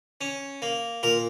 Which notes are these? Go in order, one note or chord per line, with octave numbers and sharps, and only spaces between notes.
C#4
A#3
A#2 A#4